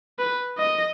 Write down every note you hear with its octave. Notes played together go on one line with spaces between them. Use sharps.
B4
D#5